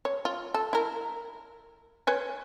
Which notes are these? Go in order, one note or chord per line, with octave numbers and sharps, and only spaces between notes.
C#5
F4
A4
E4 A#4
B4 C#5 G#5